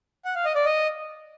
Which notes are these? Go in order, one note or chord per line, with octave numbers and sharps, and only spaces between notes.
F#5
F5
D#5
D5
D#5